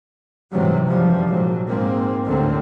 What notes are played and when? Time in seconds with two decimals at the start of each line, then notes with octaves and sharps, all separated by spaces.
0.50 G#2 C3 E3 F#3 G3
0.86 F#2 E3 F3 G3
1.25 A#1 G#2 F#3
1.67 G#2 A#3 C4
2.25 G1 D2 A2 D3 A#3 C4